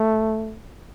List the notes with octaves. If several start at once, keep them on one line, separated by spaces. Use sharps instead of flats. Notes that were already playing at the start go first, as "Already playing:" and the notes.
Already playing: A3